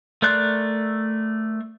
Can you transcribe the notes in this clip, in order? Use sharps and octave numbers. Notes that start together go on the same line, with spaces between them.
A3 A#4 D5 C6 F#6